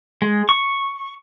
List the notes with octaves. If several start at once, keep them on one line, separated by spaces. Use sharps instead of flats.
G#3
C#6